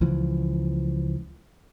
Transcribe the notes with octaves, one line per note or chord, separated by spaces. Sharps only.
C#2 E3 F3